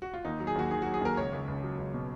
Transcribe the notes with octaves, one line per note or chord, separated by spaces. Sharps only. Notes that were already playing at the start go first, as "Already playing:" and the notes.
F#4
F4
D#2 D#4
F#3
G#4
D#2 F#4
D#3 G#4
F#3 F#4
G#4
D#2 A#4
C#2 C#5
C#2
C#2
F#3
C#2
B2